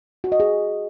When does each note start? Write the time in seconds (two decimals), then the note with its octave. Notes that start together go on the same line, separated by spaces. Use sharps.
0.24 F#4
0.32 D#5
0.40 G#4